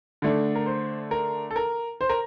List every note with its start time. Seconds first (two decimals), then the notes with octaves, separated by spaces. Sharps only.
0.22 D3 A3 D4
0.55 A#4
0.66 C5
1.11 A#4
1.51 A4
1.56 A#4
2.01 C5
2.09 A#4